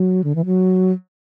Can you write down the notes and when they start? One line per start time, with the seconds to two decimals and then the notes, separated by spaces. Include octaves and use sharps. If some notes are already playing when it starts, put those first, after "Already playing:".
Already playing: F#3
0.24 D3
0.35 E3
0.46 F#3